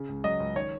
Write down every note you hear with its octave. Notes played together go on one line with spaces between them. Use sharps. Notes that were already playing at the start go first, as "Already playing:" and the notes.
Already playing: C#3
C#2
F#3 D#5
C#2
D#3 C#5